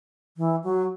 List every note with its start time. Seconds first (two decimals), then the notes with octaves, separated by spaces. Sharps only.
0.37 E3
0.64 F#3